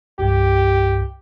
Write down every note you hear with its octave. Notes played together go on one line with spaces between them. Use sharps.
C2 G2 G4